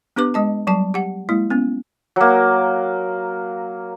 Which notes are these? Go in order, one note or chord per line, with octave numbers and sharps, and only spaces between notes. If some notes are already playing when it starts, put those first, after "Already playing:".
B3 D4 G4 B4 D6
G#3 D#5 A5
F#3 G3 A5
G4 F#5
G#3 A#3 E4
B3 C#4
F#3 A#3